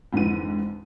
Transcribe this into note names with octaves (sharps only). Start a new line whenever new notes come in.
F2 G#2 D3 E3 D#7